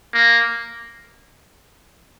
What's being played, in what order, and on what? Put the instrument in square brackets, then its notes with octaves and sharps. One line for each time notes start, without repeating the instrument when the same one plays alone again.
[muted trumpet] A#3